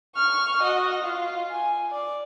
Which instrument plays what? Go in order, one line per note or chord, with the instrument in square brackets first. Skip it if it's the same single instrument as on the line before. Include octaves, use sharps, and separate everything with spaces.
[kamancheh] C#6 F6
F#4 D#5
F4
G#5
D5